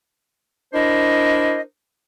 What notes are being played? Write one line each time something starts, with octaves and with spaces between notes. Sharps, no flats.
D4 E4 A#4 C5 D#5